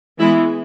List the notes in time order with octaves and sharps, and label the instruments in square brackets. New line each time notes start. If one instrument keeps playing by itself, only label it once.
[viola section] E3 G#3 B3 E4